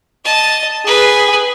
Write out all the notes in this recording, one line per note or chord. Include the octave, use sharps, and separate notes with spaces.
D#5 A5
G#4 B4 G#5